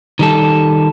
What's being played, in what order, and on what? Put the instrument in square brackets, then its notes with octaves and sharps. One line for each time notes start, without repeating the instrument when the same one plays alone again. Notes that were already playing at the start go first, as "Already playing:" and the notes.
[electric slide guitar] D#3 G3 A4